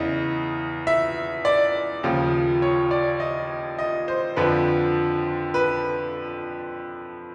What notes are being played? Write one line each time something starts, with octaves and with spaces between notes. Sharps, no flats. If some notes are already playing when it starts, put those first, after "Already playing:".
Already playing: E2 C#3 E3 D#5
E5
D5
D#2 C#3 F3
C#5
D5
D#5
D#5
C5
F2 D3 F3 B4
B4